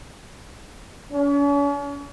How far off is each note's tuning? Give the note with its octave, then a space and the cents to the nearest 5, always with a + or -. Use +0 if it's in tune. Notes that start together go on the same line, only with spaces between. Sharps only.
C#4 +40